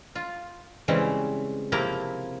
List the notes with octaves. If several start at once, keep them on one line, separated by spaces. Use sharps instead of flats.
F4
C#3 E3 G3 G#3 C4 C#4
C3 F3 A#3 E4 A#4 A#5